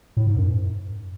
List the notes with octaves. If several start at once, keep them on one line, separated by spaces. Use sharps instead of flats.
A2
G#2
F#2